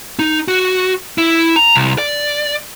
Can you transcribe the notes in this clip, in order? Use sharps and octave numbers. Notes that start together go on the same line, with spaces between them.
D#4
F#4
E4
A#5
C2
D5